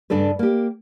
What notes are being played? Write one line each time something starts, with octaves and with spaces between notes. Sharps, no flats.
G2 C#3 D4 A4 B4
A#3 G4